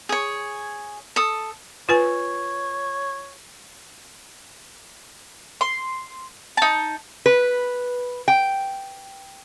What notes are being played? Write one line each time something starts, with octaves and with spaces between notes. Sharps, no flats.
G#4 C#5
A4 D#6
F4 B4 C#5 G#5
C6
D#4 A5
B4
G5